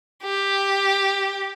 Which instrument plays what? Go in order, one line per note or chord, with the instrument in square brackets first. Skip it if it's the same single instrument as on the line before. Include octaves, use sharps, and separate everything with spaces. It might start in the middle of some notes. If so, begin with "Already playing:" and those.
[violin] G4